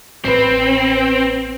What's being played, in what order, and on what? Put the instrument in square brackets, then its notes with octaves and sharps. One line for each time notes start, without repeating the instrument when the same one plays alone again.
[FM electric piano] A1 B4 [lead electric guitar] C4